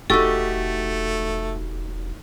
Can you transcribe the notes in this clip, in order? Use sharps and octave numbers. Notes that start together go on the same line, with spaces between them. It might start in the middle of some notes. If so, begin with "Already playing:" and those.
E1 A3 D#4 F#4 G4 A4 C#6 E6